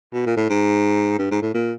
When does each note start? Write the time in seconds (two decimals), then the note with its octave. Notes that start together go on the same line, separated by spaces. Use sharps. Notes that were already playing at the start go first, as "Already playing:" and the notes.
0.13 B2
0.26 A#2
0.37 A2
0.49 G#2
1.19 G2
1.31 G#2
1.42 A2
1.54 A#2